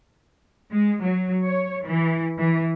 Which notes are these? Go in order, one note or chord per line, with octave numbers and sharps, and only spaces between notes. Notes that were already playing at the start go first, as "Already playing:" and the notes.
G#3
F#3
C#5
E3
E3